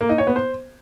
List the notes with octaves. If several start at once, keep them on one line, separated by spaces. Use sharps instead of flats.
A#3
D#4
C#5
B3
C5